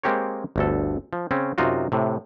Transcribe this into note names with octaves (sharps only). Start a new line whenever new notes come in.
G#3 A#3 C4 G4 A#4 C#5
G1 D2 A4
F3
C#3 C4 C#4
F#2 C3 D#4 F4 F#4
A2 C3